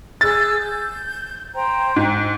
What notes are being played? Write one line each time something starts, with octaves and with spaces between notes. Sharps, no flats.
G#4 E6 F#6 A6
G6
C5 G5 A#5
G#2